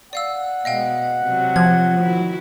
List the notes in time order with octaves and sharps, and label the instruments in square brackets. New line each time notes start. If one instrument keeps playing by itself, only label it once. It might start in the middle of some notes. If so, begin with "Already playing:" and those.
[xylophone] D5 F5 E6 [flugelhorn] F#5
[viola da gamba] B2 G#3 [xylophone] D#5 F5 G5
[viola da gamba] C3 F#3
[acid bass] F3 [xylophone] G#6
[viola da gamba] D#3 E4 F#4